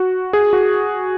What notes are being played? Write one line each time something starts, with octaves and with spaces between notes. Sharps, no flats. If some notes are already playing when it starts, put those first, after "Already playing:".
Already playing: F#4
G#4
F#4